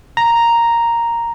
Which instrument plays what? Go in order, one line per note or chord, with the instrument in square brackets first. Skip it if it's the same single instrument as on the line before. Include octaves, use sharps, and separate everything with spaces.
[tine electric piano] A#5